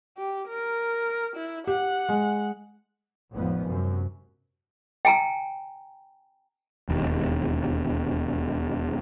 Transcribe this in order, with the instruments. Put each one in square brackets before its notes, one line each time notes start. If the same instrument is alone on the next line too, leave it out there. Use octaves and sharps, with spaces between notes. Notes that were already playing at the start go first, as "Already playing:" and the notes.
[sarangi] G4
A#4
E4
[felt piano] G4 [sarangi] F#5
[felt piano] G#3
[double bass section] G#1 F2 A2 F3 B3
F#2 C3
[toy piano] G5 G#5 A#5
[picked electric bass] E1 D#2